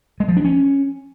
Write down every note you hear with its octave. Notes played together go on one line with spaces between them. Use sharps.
G#3
F3
D4
C#4